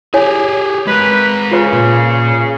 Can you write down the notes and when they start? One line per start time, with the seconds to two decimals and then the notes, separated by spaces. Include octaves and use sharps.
0.14 E4 G4 G#4 C#5 G#5
0.87 G#3 A#4 B4
1.51 C#3 F4 B4 B5
1.73 A#2